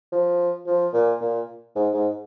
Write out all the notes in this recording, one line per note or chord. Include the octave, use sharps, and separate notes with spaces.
F3
F3
A#2
A#2
G#2
G#2